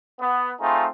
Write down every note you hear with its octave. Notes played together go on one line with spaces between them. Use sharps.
B3
A3 C4 D#4 F4 G#4